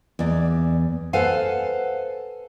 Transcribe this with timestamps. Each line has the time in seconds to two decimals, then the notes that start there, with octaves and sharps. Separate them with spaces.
0.19 E2 D5
1.13 A4 B4 C5 F5 F#5 G#5